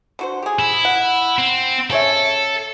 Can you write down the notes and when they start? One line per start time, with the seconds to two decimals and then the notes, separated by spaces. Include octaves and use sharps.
0.19 D3 F#4 C5
0.42 G4 G#4
0.59 E4
0.85 F#5
1.39 C4
1.90 C#3 A4 C#5 E5